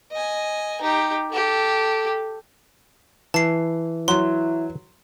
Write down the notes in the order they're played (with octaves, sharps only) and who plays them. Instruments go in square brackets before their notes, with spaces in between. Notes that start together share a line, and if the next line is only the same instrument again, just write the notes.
[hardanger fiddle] D#5 G#5
D#4 G4
G4 A4
[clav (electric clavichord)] E3 [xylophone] A5 C7
[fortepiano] F#3 [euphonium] E4 [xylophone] C6